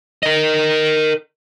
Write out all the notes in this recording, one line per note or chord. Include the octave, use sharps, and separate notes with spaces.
A#4 D#5